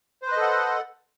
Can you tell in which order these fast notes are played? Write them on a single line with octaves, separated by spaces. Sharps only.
C5 B4 D#5 A4 F#5